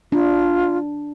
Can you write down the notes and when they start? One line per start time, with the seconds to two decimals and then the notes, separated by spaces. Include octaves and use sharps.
0.12 D4 F4